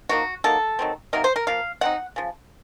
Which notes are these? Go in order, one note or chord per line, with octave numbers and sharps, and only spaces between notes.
F3 A#3 D#4 F#4
F#3 A#3 D#4 A4
D#3 F#3 C4
C3 F#3 A#3 D#4 A#4
C5
A#4
F3 A#3 F5
F#3 C4 D#4 F#5
C#3 F3